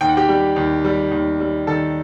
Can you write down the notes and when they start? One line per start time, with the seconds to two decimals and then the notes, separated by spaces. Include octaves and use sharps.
0.01 D#2 G5
0.09 F#5
0.17 G4 G5
0.29 G3
0.56 D#2
0.85 G3
1.11 D#2
1.40 G3
1.67 D#3 A4 A5